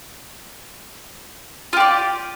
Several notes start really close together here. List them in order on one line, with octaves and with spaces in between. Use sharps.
F4 G4 D5